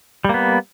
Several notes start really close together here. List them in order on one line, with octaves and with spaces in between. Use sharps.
G3 A#3 B3